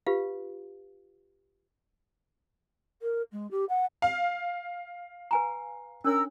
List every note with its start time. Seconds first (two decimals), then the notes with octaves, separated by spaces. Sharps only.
0.07 F4 G4 B4 F5
3.02 A#4
3.32 G#3
3.51 G4
3.69 F#5
4.02 F5
5.31 B4 G#5 A#5
6.04 C#4 D4 A#4 C#5 E6